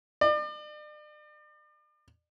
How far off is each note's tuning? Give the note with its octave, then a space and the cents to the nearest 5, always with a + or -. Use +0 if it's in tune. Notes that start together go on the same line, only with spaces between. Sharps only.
D5 +40